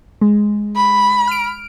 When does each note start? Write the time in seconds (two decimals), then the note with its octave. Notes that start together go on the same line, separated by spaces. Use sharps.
0.21 G#3
0.76 B5
1.27 F6 D7